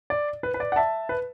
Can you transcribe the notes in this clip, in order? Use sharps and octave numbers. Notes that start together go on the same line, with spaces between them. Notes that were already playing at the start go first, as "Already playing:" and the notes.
D5
B4
B4
D5
F#5
E5 A5
B4